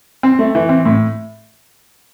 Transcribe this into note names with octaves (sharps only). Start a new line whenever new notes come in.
C4
A3
E3
C4
A2